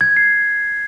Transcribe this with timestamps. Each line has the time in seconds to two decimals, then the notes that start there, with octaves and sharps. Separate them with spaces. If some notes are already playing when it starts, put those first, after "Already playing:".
0.01 G#6
0.17 C7